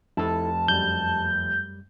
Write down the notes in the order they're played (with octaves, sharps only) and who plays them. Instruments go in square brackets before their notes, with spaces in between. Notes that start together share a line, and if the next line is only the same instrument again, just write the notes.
[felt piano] F1 [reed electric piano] E4 A4 [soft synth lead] A5
[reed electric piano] F#2 G3 [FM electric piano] G6